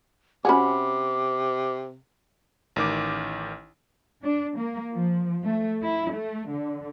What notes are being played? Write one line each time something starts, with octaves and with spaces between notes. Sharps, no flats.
C3 C#4 F#4 G#4 F#5 B5 D6
A1 D#3 D6
D4
A#3
F3
A3
E4
A3
D3